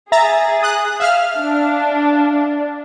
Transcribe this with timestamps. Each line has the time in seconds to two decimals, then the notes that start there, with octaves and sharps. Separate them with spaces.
0.12 G#4 E5 A#5 A6
0.63 D#6 F#6
1.00 E5 F5 F6
1.38 D4